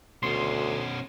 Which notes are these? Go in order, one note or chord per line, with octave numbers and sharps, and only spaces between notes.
D2 B2 C#4 C6